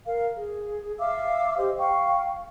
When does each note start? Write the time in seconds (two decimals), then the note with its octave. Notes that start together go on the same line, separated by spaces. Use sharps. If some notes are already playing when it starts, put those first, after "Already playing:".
0.06 A#4 F5
0.36 G#4
0.99 E5 F5 D6 E6
1.58 G4 C5 D#5
1.78 F5 G5 C#6